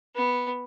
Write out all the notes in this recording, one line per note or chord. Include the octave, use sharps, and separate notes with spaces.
B3